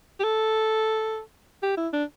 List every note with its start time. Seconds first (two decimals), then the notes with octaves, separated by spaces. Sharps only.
0.20 G4
0.24 A4
1.63 G4
1.77 E4
1.93 D4